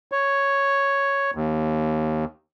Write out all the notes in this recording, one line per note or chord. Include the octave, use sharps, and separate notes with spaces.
C#5
D#2